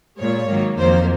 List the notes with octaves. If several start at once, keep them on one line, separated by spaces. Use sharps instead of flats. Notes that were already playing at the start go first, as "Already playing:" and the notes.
A#2 G#3 C#5
G#2 D#3 F#3 A#3
F2 D#3 F#3 A#3 C5